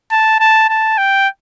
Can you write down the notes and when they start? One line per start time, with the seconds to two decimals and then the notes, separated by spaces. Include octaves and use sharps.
0.11 A5
0.39 A5
0.69 A5
0.97 G5